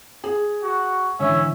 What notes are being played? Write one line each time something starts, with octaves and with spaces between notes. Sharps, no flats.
G#4
F#4
G#2 D3 E3 C#4 E5